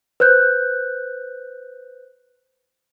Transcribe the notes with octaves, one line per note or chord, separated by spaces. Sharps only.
B4 C5 F#6 G6